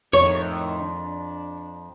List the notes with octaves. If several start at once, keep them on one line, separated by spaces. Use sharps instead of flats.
F2 A2 D#3 C#5
D4